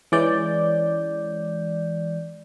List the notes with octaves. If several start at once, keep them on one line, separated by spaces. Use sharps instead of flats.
E3 G#3 C#4 D5 G6